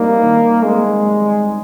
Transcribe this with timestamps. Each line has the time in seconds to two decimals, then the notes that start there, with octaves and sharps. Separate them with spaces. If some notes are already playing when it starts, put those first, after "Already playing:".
Already playing: G3 A#3 C4 D#4
0.23 D#3
0.64 G#3 C4
1.05 G3
1.46 D#4